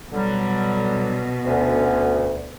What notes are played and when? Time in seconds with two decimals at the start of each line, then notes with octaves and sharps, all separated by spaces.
0.12 B2 D3 F#3 G3
1.45 D2 D3 B3 C#4